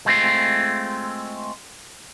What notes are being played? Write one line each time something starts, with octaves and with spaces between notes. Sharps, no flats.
G#3 A3 C4 F4